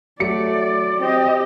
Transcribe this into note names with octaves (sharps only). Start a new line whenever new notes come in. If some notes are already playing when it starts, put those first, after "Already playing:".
F#3 A3 D5 C#7
C4 G4 D#5